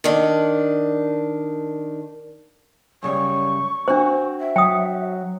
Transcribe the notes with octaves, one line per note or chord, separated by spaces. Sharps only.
D#3 D4
F#2 C#3 G3 C#6
C4 D4 F#4 C5
E5
F#3 G5 D#6